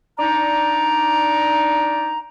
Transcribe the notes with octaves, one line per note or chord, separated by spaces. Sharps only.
D4 D#4 D5 A#5